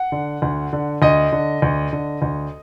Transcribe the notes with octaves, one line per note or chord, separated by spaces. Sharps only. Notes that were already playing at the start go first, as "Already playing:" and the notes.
Already playing: F#5
D3
D2
D3
D2 D#5
D3
D2
D3
D2